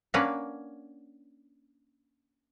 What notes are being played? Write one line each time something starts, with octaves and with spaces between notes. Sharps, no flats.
A#3 C#4 D4 B4 F#5